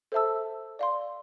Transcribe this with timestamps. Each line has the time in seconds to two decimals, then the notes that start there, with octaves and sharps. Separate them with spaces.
0.12 A4 C5 E5 A5 E6
0.79 D5 F5 C6